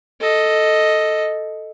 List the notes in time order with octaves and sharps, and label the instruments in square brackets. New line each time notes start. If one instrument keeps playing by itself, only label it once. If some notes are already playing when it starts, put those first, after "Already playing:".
[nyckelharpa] A4 D#5